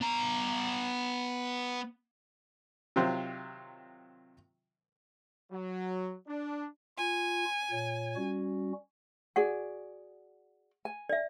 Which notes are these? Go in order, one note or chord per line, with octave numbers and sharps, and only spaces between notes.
B3 A#5
C3 D#3 F#3 F4 C5
F#3
D4
F4 G#5
A#2 C#5
G3 C#4 F#4
F#4 G#4 D5 F#5
G#5
D5 E5